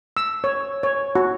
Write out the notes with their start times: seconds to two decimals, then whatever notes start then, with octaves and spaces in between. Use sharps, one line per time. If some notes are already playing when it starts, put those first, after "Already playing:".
0.17 E6
0.44 C#5
0.83 C#5
1.15 F#4